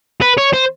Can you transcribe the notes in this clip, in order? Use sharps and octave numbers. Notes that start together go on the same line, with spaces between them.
B4
C#5
C5